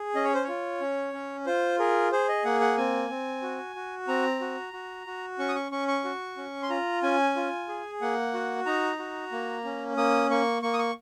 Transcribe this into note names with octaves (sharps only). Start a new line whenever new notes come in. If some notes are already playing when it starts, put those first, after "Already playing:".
Already playing: G#4
C#4 D#5
C#5
C5
F4 C#5
C#4
C#4
F4 C5
G#4 A#4
G#4 C5
D#5
A#3 F#5
F#5
C4 G#5
C4
F#4
F#4
C4 A#5
F#4
F#4
F#4
C#4 C#6
D#6
C#6
C#4 C#6
C#6
F#4
C#4
C6
F4 A#5
C#4 G#5
F4
G#4
A#3 F#5
F#4
D#4 A#5
F#4
A#3
C#4
A#3 D#6
A#3 C#6
A#3 C#6
D#6
C#6